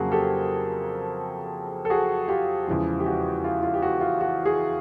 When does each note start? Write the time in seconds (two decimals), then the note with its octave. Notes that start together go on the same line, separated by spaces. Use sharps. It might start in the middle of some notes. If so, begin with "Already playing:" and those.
Already playing: F2 C#3 F#3 A#3 F#4 G#4
0.12 G4 A4
1.85 A4
1.90 F#4 G#4
2.28 F4 G4
2.67 E2 C#3 F3 G#3
3.00 G4
3.06 F#4
3.44 F4
3.63 F4
3.74 G4
3.82 F#4
4.01 F4
4.21 F#4
4.45 F#4 G#4